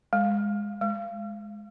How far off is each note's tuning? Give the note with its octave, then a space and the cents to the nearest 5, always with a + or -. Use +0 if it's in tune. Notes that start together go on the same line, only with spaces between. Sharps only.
G#3 -15
G#3 +10